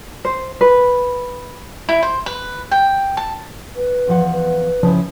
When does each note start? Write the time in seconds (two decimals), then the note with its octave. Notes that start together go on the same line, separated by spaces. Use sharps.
0.25 C5
0.61 B4
1.89 E4
2.02 C5
2.26 B4
2.71 G5
3.17 A5
3.76 B4
4.07 E2 F3 F#5
4.32 B4
4.83 C#3 F3 E4